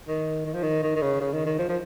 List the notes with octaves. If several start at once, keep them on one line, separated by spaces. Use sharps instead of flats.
D#3
D#3
F3
D#3
D#3
D#3
C#3
C#3
D#3
D#3
F3
F3